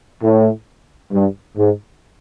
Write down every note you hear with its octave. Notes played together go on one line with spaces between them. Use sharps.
A2
G2
G#2